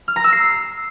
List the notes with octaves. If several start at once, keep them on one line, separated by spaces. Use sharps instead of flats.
F6
A#5
E6
C7